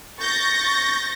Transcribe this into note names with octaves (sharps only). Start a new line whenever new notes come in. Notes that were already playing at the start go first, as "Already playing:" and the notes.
C#6 G6 A6 A#6